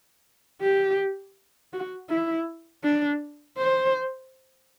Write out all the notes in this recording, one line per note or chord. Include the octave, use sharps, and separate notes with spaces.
G4
F#4
E4
D4
C5